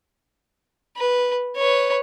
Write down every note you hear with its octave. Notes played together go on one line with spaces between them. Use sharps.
B4
B4 C#5